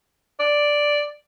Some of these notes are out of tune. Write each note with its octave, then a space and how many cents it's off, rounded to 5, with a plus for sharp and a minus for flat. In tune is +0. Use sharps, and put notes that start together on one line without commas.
D5 +0